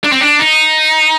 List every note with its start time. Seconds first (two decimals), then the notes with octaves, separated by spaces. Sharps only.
0.04 D4
0.12 C4
0.21 D4
0.39 D#4